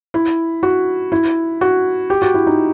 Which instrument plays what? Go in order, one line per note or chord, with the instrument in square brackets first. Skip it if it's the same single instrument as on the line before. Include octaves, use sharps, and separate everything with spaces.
[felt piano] E4
F#4
E4
F#4
G4
F#4
E4
D#4